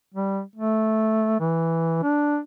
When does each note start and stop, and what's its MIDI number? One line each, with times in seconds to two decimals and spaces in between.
0.14 0.41 55
0.55 1.38 57
1.39 2.02 52
2.03 2.38 62